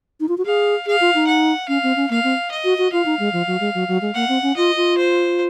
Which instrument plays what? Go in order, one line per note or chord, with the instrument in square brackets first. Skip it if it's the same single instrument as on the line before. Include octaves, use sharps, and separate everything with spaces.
[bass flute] D#4
F4
F#4
[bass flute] G#4 [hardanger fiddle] F5
[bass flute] G#4 [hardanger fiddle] F5
[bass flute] F4
D#4
[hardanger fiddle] F#5
[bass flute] C#4 [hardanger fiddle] F5
[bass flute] C4
C#4
[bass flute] A#3 [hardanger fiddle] F5
[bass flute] C4
[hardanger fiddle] D#5
[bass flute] F#4
F#4
[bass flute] F4 [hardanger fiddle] F5
[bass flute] D#4
G#3
F3
F#3
G#3
F#3
F#3
G#3
[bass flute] A#3 [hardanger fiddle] F#5
[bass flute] C4
C#4
[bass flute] F4 [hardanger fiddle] D#5
[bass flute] F4
[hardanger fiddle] C5